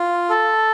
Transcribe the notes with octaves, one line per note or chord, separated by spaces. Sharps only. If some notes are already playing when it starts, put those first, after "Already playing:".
Already playing: F4
A4